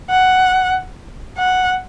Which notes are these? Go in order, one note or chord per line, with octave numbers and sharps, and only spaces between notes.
F#5
F#5